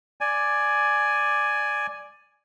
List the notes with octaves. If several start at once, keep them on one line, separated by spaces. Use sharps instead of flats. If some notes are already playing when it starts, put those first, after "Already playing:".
D5 G#5